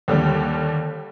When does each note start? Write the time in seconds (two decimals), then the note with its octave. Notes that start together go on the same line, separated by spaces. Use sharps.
0.08 D#2 D3 G3